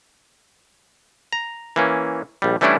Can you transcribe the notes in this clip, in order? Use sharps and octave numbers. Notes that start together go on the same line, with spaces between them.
A#5
E3 A#3 C#4
A#1 G3
E3 G3 A3 C#4 D4 E4